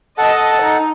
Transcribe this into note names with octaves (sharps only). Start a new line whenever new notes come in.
A4 D#5 F#5 A5
D#4